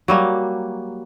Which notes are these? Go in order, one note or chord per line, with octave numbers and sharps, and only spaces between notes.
F#3 G3 A#3